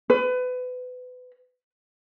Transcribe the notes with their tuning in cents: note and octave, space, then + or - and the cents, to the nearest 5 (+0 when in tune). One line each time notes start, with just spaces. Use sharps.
B4 +25